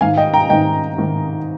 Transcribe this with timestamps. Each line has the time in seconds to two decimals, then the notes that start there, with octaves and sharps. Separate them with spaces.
0.01 G#2 D#3 F5 G#5
0.17 D#5 G5
0.34 G5 A#5
0.49 G#2 D#3 D#5 G5
0.98 G#2 D#3